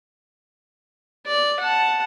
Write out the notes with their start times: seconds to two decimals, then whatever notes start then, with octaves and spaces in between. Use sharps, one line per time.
1.26 D5
1.60 F#5 A5